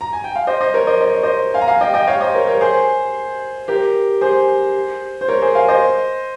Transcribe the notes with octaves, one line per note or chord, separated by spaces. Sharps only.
A#5
G#5
G5
F5
C5 D#5
C5 D#5
A#4 C#5
C5 D#5
D#5
C#5
C5 D#5
F5 G#5
A#5
F5 G#5
D#5 G5
D#5 G5
C#5 F5
C5 D#5
A#4 C#5
A#4 C#5
G#4 C5
G4 A#4
G#4 C5
C5
A#4 C#5
G#4 C5
F5 G#5
C5 D#5